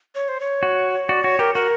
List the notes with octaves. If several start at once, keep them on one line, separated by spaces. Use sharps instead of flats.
C#5
C5
C#5
F#4
F#4 D5
F#4 C#5
G4 A#4
F#4 A#4